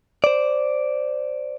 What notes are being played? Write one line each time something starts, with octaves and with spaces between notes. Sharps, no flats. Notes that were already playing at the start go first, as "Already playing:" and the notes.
C5 D5